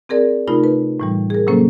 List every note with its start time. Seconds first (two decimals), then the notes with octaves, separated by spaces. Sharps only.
0.09 C4 G#4 A#4 D5
0.48 C3 A3 D#4 F4 A#4 B5
0.64 B4
1.00 A2 E3 G3
1.30 G#4 A#4
1.47 C3 F#3 A#3 C#4 A4 C5